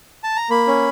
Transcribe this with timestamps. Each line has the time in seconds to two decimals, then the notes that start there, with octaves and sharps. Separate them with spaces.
0.24 A5
0.36 A#5
0.50 A#3 B5
0.67 C#4